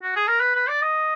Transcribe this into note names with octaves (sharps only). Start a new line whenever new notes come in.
F#4
G#4
A#4
B4
B4
D5
D#5